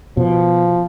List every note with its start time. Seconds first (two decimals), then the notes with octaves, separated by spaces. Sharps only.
0.17 B2 F3